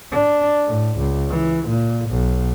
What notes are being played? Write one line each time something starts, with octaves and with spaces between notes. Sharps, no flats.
D4
A2
C#2
E3
A#2
B1